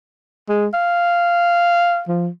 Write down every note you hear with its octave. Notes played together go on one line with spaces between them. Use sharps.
G#3
F5
F3